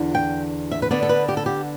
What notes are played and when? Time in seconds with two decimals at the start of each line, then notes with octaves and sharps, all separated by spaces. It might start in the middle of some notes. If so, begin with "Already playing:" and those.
Already playing: E2 D3 D4
0.15 G5
0.71 E5
0.82 B4
0.91 D3 B3 D4 D5
1.03 A4
1.09 B4
1.29 G4
1.37 A4
1.46 G4